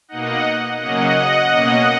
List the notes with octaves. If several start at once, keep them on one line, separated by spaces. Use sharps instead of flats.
B2 A#3 D#4 D#5 F#5
C#3 F#3 A#3 C#4 D#5 F#5
B2 A#3 C#4